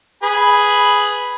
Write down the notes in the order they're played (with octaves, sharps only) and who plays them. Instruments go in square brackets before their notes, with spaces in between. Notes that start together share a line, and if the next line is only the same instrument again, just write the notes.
[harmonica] G#4 B4 B5